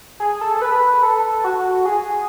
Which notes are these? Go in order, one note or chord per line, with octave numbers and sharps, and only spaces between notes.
G#4
A4
A4
B4
A4
F#4
G#4